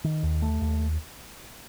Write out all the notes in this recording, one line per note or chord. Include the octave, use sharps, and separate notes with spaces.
D#3
D#2
A3
D#2